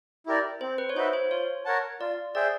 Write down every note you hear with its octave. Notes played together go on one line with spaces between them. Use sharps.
E4 G4 A#4 D5
C4 C5
B4
C#5
D#4 F#4 B4 C5 E5
C5
F4 C#5
A#4 C#5 F#5 A5
F4 D5
G#4 C5 D5 E5 G5